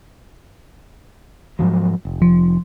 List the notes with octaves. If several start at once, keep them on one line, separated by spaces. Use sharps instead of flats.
G#2 F3 F#3
F1
F3